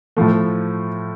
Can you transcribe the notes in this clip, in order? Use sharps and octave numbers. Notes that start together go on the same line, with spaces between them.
A2 F3 A3